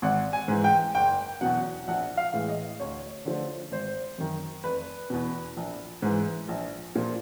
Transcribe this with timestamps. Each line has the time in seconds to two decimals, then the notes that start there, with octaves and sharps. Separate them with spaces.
0.02 G#1 F#5
0.33 G#5
0.48 G#2 E3
0.64 G5
0.95 F#1 G5
1.41 E2 B2 F#3 F#5
1.88 A#1 F#5
2.17 F5
2.33 A2 E3 G#3
2.49 D#5
2.80 D2 C#5
3.25 D3 F3 A3
3.71 G#1 C5
4.18 F#2 D#3
4.64 F1 B4
5.10 E2 B2
5.57 A#1
6.02 G#2 E3
6.48 A#1
6.96 A#2 F3